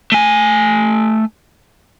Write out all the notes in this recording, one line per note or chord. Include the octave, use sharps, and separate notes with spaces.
A3 G#5